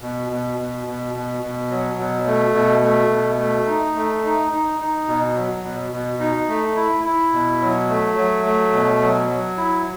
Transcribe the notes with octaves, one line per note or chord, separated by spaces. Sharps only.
B2
B2
B2
B2
B2
B2
F#3
B2
A3
B2
A3
B2
A3
D#4
A3
D#4
D#4
D#4
B2
F#3
B2
B2
D#4
A3
E4
E4
B2
F#3
A3
F#3
A3
B2
F#3
F#3
E4